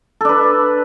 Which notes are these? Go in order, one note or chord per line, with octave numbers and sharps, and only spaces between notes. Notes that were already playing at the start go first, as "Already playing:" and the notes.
D4 A4 B4